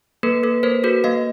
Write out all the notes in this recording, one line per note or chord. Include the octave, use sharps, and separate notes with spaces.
A#3 A4 B4
A#3 A4 B4
A#3 A#4 C5
F#4 A4 B4
A#3 D#5 F5